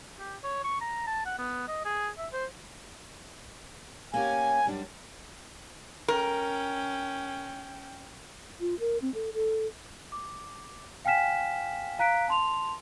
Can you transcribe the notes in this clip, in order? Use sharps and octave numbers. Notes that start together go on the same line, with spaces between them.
G4
C#5
C#6
A#5
A5
F#5
B3
D#5
G#4
E5
C5
A#3 C#4 G4 G#5
F#2 G3 D4
C#4 A#4 G5
F4
A#4
C4
A4
A4
D6
F5 G5 G#5 F6 B6 E7
F5 A#5 F#6 B6 D7
A5 C6 F7